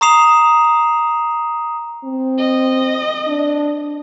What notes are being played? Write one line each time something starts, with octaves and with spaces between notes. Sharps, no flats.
A#5 C#6 D#6 C7 E7 F7
C4
D#5
D4